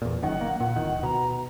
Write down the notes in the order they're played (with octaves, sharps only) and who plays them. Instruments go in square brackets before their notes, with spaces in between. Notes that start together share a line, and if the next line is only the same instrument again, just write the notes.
[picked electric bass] E2 A#2
[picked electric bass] F#1 F#2 D#3 [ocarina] F#5
[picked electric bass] A#3
[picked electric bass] A#2 [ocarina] F#5
[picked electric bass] D1 D#3
[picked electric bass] B2 [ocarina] A#5